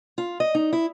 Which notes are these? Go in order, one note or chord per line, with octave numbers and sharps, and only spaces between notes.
F4
D#5
D#4
E4